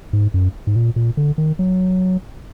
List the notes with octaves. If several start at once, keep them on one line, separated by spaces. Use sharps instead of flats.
G#2
F#2
G#2
A#2
A#2
D3
D#3
F#3